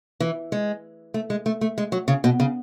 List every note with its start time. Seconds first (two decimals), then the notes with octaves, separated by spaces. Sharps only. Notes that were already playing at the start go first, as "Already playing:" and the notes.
0.20 E3
0.52 G#3
1.14 A3
1.30 G#3
1.46 A3
1.61 A3
1.78 G#3
1.92 F#3
2.08 C#3
2.24 B2
2.40 C#3